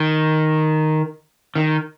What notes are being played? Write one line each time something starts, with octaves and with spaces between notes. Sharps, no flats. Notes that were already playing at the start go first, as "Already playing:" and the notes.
Already playing: D#3
D#3